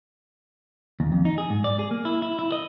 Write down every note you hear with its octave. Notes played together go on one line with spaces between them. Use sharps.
D#2
F2
D#4
G#4
G#2
D5
G#4
A#3
E4
E4
E4
D#5